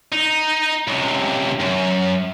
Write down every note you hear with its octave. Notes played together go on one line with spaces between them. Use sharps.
D#4
C#2 C3
F#2